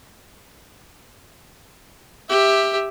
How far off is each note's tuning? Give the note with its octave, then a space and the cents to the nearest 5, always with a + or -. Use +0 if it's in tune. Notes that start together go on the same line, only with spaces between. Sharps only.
G4 +10 E5 +0